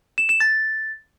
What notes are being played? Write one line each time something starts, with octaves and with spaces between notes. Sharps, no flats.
E7
E7
A6